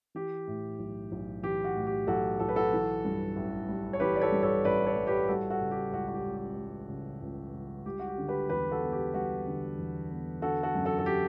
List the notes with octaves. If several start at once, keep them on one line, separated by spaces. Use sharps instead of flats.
E3 G4
A2
B1
B1
E3 G4
F#4
A2
G4
B1 F#4 A4
B1 A4
B4
F#4 A4
E3
G2
A1
G3
C#5
E3 G4 B4
D5
A4 C#5
G2
A4 C#5
A1 B4 D5
A4 C#5
G3
G4 B4
G3 F#4 A4
F#4 A4
C#3
G4
C#2 F#4
F#4
G4
C#2
G4
G3
C#3
C#2
C#2
G3 G4
F#4
G4
D3
G4 B4
E2 G4 B4
F#4 A4
B3
G4
G3 F#4
D3
E2
B3
D3 F#4 A4
F#4 A4
F#2
F#4 A4
A4
G4